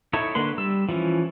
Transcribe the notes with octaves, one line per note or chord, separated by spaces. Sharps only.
D#4 E4 A4 C#5
D3 A#3 B4 C6
G3 E6
E3 F3 C#4